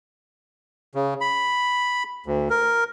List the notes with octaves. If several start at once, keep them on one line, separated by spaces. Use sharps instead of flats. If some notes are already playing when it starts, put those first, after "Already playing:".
C#3
B5
D2
A#4